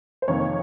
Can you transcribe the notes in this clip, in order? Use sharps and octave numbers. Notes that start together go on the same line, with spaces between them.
C5
F2 C3 D#3 A#3 C#5